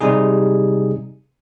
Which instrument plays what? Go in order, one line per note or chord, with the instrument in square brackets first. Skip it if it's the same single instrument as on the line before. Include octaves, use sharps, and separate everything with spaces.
[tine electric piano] C3 G3 D#4 G#4